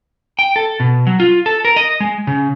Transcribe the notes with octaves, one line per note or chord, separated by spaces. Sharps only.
G5
A4
B2
F#3
F4
A4
A#4
D#5
G#3
C#3